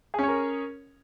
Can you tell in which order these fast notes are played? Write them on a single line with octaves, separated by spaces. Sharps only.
G#4 C#4 C#5 A#4